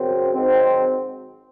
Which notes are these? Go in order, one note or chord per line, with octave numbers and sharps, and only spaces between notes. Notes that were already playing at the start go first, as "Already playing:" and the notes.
Already playing: F#2 C#3 F#3 C4
G#2 D#3 F#3 C4